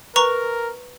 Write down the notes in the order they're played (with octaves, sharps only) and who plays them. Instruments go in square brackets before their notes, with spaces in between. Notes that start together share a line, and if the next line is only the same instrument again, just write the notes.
[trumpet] A#4 [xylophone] B4 A#5 C#6